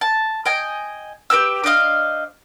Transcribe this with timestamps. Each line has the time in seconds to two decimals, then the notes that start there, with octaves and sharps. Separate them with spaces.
0.01 A5
0.46 D#5 G5 G#5
1.30 G4 B4 G5 E6
1.64 D4 C5 D#5 F5